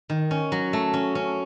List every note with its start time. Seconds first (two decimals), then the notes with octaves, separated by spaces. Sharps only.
0.10 D#3
0.31 C#4
0.52 F#3
0.73 A3
0.93 C#4
1.15 C#4